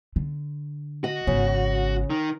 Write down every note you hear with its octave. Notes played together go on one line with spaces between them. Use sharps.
D3
F#4 D#5
G#1 C#3 B3
D#3